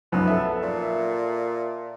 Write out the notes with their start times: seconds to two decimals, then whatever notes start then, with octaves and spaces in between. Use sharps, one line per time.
0.12 B1 F#2 F3 B3
0.27 A4 E5
0.62 A#2